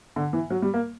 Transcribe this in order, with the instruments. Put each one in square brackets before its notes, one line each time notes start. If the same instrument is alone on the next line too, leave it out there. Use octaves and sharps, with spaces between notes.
[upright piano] D3
E3
F#3
G3
A#3